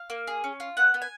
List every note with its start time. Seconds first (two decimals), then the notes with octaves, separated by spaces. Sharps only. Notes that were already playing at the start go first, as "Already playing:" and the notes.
Already playing: F5
0.10 A#3
0.27 G#4
0.44 C#4
0.60 F4
0.77 B3 F#5
0.94 B3
1.02 G#5